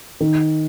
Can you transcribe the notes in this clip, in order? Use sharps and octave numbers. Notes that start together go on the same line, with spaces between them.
D#3